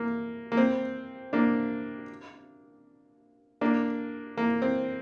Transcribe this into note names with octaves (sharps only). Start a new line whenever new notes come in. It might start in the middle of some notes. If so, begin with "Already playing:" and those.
Already playing: A#3
A#3
C4
A#3 D4
A#3 D4
A#3
C4